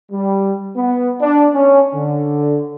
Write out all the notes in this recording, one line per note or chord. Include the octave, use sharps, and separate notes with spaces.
G3
B3
D4
C#4
D3